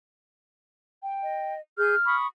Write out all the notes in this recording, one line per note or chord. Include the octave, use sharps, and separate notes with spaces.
G5
D#5
G#4 F6 G6
B5 C#6 D#6